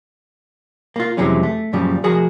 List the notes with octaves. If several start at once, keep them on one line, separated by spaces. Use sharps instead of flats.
A#3 F4
F2 C3 E3 F#3 G#3 C#4
A3
F#2 A#2 C#3 F3 G3
F3 F#4 G#4 A#4